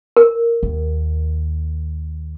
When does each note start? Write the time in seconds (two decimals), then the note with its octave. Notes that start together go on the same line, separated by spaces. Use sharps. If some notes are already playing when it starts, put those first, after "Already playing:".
0.17 A#4
0.63 D#2